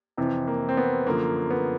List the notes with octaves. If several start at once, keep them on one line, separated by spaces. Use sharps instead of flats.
F2 C3 E3
A#3
C4
B3
F#2 D3 F3 A#3
B3